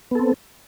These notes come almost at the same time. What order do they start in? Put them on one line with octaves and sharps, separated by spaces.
B3 A4 C4